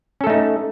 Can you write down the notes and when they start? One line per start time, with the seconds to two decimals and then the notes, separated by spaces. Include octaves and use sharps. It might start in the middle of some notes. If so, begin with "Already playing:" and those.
0.21 C#4
0.24 A4
0.27 A3
0.30 D#4